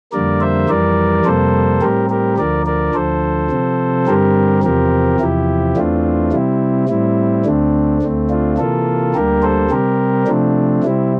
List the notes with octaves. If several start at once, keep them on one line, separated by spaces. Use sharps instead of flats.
F2 D3 G3 A#3 A#4 D5
C5 E5
F2 E3 G3 A#4 D5
F2 C3 G3 A#3 A4 C5
A2 G3 C4 G4 A#4
G4 A#4
D2 D3 F3 A#4 D5
A#4 D5
D2 D3 F3 A4 C5
C3 F3 C4
G2 D3 G3 C4 G4 A#4
E2 C3 F3 C4 G4 A#4
E2 C3 F3 E4 G4
E2 E3 A3 C4 D4 F4
C3 G3 C4 E4
A2 G3 C4 E4
D2 D3 A3 C4 D4
D2 D3 A3 C4
D4 F4
C3 E3 A#3 F4 A4
D2 D3 G3 A#3 G4 A#4
A4 C5
C3 G3 C4 G4 A#4
C3 F3 A3 C4 D4
C3 G3 C4 E4